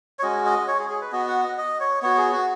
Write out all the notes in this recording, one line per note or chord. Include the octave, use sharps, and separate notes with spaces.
C#5
G#3 C#4 F#4 D#5
D#5
C#5
G#4
G#4
B4
B3 F#4 D#5
F#5
D#5
D#5
C#5
B3 F#4 C#5
G#4
F#4